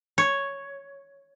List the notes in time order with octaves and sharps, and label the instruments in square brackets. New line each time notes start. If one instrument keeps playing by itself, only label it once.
[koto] C#5